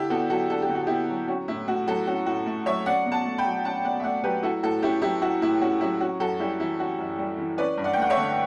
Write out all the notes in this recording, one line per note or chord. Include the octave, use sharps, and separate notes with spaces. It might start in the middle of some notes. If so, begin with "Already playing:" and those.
Already playing: D3 D4 E4 G4
B3 F#4 A4
F#3 F#4 A4
D4 A4
G4
D3
F#4
B3 E4 G4
F#3
C#4 F#4
A2 E4
A3 F#4
F#3 F#4 A4
C#4 F#4
A2 F#4
A3
F#3 C#5 E5
C#4 D5 F#5
B2
F#5 A5
A3
G5 B5
F#3
C#4 F#5 A5
B2 D5 F#5
E5
A3 D5 F#5
F#3 G4 B4
E4 F#4 A4
A2 F#4 A4
C#4 E4 G4
F#3 E4 G4
E4 F#4
A2 E4
C#4 F#4
F#3 E4
C#4 F#4
F#2 F#4 A4
G3 E4 G4
E3 E4
C#4 F#4
F#2
G3
E3
C#4 B4 D5
G2
D5 F#5
G5
A3 F#5
C#5 E5
D3